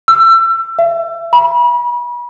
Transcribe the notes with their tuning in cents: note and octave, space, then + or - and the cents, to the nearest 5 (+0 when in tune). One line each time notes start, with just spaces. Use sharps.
E6 +30
E5 +35
B5 -35